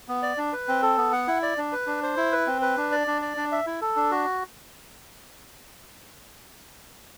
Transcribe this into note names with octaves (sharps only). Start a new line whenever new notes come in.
B3
D5
D4
B4
C4
A4
B3
F#5
E4
D5
D4
B4
D4
C5
E4
B4
C4
B4
D4
D5
D4
D5
D4
E5
E4
A4
D4
F#4